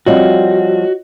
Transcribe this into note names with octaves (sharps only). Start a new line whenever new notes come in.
F3 G3 C4 F4 F#4 C#5 D#5